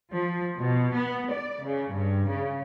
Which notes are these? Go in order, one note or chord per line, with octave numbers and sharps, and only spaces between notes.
F3
B2
B3
D5
C#3
G2
C#3